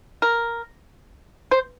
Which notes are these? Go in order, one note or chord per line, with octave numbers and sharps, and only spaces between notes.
A#4
C5